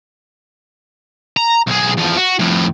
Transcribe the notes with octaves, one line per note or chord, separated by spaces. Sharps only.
A#5
B1 G#4
E2 F3
F#4
F2 A2